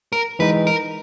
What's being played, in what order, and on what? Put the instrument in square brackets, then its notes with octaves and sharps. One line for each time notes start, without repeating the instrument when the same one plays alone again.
[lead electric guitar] A#4
[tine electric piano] E3 G#3 D#4 [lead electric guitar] B4
[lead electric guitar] A#4